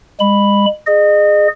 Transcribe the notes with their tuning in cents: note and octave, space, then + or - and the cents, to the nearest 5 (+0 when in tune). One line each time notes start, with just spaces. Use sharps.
G#3 -35 B5 +0
G#4 +0 D#5 -35